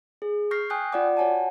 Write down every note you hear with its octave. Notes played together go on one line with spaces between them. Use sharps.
G#4
C#6 F6 G6 A#6 C7
G5 G#5 D#6 F#6 G6
F4 D5 F#5 D6
F#4 C#5 F#5 G#5 A5